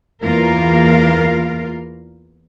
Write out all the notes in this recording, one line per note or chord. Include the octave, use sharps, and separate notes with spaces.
E2 E3 A#3 F4 A#4 F5